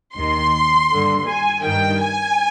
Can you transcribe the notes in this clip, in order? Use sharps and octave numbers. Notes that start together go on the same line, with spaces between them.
D#2 D#3 C6
G2 D3
G#5
G2 D#3 G5
G#5